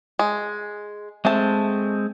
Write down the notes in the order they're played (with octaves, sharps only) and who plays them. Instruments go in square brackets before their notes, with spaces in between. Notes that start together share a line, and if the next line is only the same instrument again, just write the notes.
[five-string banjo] G#3
[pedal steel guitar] G#3 C4 [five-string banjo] A3 A5